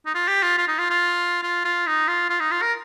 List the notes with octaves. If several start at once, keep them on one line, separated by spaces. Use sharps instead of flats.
D#4
F4
G4
F4
F4
D#4
F4
F4
F4
F4
D#4
F4
F4
D#4
F4
A#4